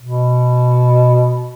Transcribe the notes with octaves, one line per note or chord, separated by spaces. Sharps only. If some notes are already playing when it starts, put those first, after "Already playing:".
B2